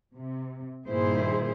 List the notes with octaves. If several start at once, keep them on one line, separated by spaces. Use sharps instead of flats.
C3
G2 A#2 D#3 E4 G#4 C5